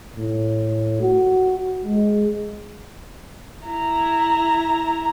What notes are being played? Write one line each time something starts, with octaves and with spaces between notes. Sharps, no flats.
A2
F#4
G#3
E4 A#5